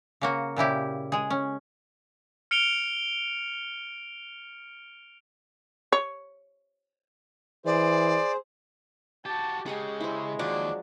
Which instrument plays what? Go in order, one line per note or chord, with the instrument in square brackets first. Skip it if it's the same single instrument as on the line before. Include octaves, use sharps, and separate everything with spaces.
[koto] C#3 A#3 F#4
A#2 C#3 E4 G4
G#3 G#4
C#4
[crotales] F6 C#7 D7 F7 G7
[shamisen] C#5
[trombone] E3 [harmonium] G#4 C5 [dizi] D5
[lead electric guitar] F#4 G4 [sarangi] A5
[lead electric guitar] C#3 [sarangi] G#3 [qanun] G4 F#5 G#5
[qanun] E4 C5
[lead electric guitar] D#2 [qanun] F3 F#3 [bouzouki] D4